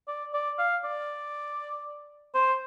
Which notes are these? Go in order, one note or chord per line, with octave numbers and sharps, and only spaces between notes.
D5
D5
F5
D5
C5